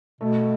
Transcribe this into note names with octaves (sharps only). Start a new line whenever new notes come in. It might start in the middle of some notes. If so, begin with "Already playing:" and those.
B2 A3